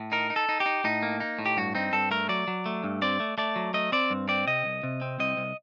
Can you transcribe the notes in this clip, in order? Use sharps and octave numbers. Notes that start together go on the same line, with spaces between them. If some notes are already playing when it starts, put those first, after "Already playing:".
Already playing: A2
D#4 A#4
D#4
A4
D#4
G4
D#4
A2 D#4
A#3
D#4
A2
G4
G2 F#4
C4 D#4
G2 A4
A3 A#4
F#3 D5
F#3
A3
G2
C4 D5
A3
A3 D5
F#3
A3 D#5
C4 D5
G2
C4 D5
C3 D#5
C2
C3
C4
C2 D#5
C2